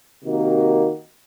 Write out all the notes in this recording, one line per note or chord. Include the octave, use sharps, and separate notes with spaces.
C3 D#3 A#3 D#4 F#4